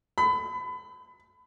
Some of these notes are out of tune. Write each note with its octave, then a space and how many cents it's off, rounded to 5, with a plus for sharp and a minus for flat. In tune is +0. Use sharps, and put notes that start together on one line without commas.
B5 +30